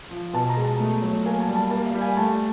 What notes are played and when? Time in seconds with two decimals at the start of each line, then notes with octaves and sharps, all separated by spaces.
0.11 F3
0.33 B2 A5
0.49 A#5
0.57 G#3
0.65 A5
0.80 A3
1.02 F#3
1.26 A#3 G#5
1.40 A5
1.48 G3
1.55 A5
1.71 A#3 A5
1.86 F5
1.94 G3
2.01 G#5
2.17 A3 A5